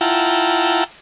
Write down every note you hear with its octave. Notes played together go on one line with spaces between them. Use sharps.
E4 F4 F#5 G5 A5 A#5